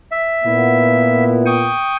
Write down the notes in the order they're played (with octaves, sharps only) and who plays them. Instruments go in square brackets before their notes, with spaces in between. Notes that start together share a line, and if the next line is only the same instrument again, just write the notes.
[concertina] E5
[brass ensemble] A#2 A#3 B3 [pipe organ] E4
[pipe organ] G5 C#6 D#6